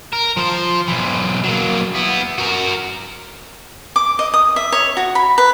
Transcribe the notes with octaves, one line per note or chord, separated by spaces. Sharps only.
A#4
F3 C5
B1 E3
F#3 A#3
B3 E4
F#4 A#4
D6
D#5
D#6
E5
C#5
F#4
B5
B4